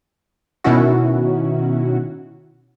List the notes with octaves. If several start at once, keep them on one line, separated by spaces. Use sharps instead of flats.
B2 D#3 C#4 E4 F#4